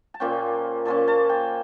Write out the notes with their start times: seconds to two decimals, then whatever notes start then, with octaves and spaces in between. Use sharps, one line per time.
0.14 A5
0.20 A#2 F3 A#3 C#4 G5
0.85 A#2 F3 A#3 C#4 A5
1.08 A5
1.29 G5